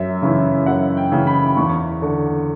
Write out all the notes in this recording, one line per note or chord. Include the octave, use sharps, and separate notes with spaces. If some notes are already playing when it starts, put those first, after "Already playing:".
Already playing: F#2 E5
C#3 E3
F#2 F#5
G5
C#3 E3
B5
E2 C#6
D3